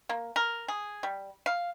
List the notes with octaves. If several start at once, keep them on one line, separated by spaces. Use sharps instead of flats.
A#3
A#4
G#4
G3
F5